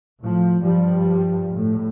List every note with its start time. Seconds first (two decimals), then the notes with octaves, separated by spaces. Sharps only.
0.20 A2 F3
0.62 G2 F3 G3
1.54 A2